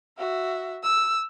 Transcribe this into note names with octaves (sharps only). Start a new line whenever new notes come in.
F#4 E5
E6